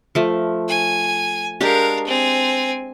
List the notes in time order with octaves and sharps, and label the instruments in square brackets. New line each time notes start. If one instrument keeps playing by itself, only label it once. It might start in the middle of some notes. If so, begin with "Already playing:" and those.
[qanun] F3 A3
[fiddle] G#5
[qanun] G#3 D4 G4 [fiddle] A#4 F5
[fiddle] C4 G#5